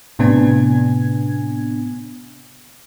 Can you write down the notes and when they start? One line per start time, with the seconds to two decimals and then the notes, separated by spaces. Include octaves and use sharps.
0.19 A2 C3 B3 D4 G#5 G#6